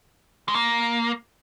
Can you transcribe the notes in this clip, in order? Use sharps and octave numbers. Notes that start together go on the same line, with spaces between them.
G#3
A#3